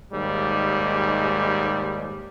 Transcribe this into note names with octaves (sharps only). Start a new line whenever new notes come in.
D#2 G#2 G3 G#3